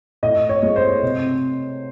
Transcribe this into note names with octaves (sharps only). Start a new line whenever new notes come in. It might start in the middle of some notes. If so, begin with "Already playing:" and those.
A2 D#5
C#5
G#3 C4
C5
C3